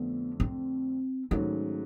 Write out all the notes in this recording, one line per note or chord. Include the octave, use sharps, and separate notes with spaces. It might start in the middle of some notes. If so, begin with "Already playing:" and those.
Already playing: F2 D3 A3 B3
C4
G#2 D#3 F#3 A3 C#4